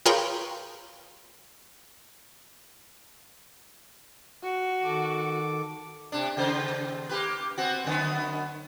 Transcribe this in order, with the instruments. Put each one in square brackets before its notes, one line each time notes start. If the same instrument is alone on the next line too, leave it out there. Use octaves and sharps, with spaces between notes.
[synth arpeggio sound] F4 G#4 A#4 B4 C#5 G5
[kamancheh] F#4
[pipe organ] D#3 A4 D6
[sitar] C3 D4
D#2 C#3 C5
A#3 G4 B4
B3 C4 F#4
F#2 D3 B3